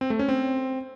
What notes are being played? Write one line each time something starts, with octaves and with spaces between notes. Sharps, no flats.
C4
A3
C#4
C4